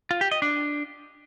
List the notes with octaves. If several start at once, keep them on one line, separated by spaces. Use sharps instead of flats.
F4
G4
D#5
D4